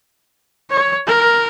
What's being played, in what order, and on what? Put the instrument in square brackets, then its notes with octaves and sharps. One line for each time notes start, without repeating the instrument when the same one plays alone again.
[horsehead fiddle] C#5
A#4